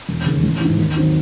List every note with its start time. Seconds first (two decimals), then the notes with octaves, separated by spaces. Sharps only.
0.08 E1
0.26 D#2 C#3
0.43 A1
0.61 G#2 E3
0.78 D#2
0.96 D#3 F#3 C4 D#4